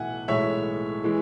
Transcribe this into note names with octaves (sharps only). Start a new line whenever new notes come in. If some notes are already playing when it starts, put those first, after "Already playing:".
Already playing: B1 A2 E3 E5 F#5 G#5
B1 A2 E3 G#3 C#5 E5
E3 G#3